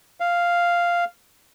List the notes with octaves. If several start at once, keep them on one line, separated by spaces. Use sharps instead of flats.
F5